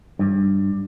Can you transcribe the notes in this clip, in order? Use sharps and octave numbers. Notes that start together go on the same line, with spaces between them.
G2